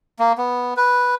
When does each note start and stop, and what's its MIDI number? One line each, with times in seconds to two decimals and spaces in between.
0.19 0.33 58
0.38 0.74 59
0.77 1.15 71